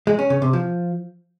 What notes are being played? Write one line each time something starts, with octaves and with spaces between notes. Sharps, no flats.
G#3
C#4
C#3
C3
F3